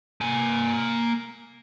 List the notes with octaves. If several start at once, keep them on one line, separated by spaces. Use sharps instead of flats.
A#3 G#5